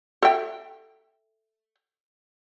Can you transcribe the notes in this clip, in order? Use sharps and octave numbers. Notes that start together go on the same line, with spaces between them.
A4 E5 G5